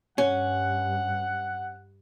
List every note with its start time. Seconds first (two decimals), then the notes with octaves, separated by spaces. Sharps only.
0.18 G2 C#4 F#5